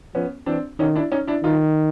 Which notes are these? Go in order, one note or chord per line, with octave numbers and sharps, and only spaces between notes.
F3 B3 C#4
E3 C4 D4
D#3 C#4 D#4
D4 E4
C#4 D#4
D4 E4
D#3 D#4 F4